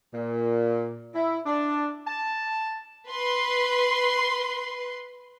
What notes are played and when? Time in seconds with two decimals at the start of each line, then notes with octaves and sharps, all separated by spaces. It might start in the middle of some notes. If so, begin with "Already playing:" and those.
0.14 A#2
1.15 E4
1.46 D4
2.07 A5
3.10 B4 C6